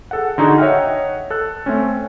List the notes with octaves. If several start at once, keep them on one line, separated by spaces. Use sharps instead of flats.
G#4 A4 F#5
D3 D#4 F#4 G#4
C#5 D#5 E5 F#5 G5 F6
A4 F#6
A3 C4 C#4